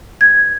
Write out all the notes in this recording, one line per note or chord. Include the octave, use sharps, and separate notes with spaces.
G#6